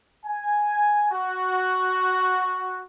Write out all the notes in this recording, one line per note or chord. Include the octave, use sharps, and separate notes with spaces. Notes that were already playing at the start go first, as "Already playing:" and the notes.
G#5
F#4